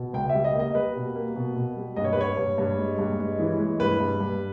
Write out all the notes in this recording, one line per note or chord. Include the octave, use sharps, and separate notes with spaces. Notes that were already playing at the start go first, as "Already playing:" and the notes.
Already playing: B2
C#2 G5
G3 E5
D#5
A#3 D#5
G3 B4
B2
A#3
B2
B2
G3
G2 D#5
C#5
B4
G2 C#5
G2
G2
G#3
G2
G#3
E3
G#3
G2 B4
G2
G2